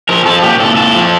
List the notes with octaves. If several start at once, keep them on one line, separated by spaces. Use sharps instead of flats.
F3 A#4
F3 A4
A#2 G4
A#2 A4
A#2 A4
F3